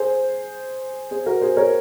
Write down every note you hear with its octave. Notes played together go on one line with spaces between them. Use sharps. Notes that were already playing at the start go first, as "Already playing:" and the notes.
Already playing: G#4 C5
G#4 C5
F#4 A#4
G#4 C5
A#4 C#5